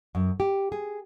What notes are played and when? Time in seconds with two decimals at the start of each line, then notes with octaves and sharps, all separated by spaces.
0.15 F#2
0.40 G4
0.72 G#4